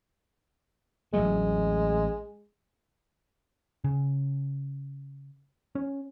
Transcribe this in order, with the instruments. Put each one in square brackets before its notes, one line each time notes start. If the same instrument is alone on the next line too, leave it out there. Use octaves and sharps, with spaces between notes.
[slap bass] A1 F#3 A3 [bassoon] G#3
[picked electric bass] C#3
C#4